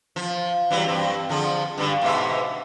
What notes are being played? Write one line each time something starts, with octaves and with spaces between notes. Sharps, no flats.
F3
E3 F#3 G3
G2 C4
D3 F3 G#4
G2 D3
G#2 B2 E5